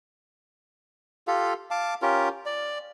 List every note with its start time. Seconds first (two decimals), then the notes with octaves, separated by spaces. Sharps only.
1.28 F4 G4 A4 F5
1.71 F5 A5 D6
2.02 C#4 F4 G4 A#4
2.46 D5